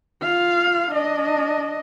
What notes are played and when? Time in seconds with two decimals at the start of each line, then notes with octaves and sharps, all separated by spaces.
0.23 F4 F5
0.91 D4 D#5